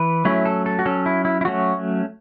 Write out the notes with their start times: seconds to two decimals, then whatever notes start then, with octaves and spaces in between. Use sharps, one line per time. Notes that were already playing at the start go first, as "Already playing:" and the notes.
Already playing: E3 B4
0.25 F#3 A3 C#4 E4
0.45 A4
0.66 A4
0.79 F#4
0.86 F#3 C#4 A4
1.06 E4
1.25 E4
1.41 E4
1.45 F#3 A3 C#4 F#4